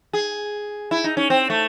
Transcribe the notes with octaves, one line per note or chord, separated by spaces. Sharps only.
G#4
E4
D#4
C#4
C4
A3